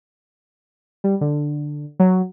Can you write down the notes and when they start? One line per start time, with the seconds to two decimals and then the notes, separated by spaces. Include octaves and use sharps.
1.04 G3
1.21 D3
1.99 F#3